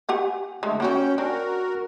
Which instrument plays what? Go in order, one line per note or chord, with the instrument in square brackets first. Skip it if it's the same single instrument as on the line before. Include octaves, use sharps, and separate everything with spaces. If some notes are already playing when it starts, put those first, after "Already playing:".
[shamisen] G4 F#5 G#5
[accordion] D3 A3 [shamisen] G#3
[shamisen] A#3 F#4 C#5 [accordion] C#4 G5
[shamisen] D4 [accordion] F#4 A#4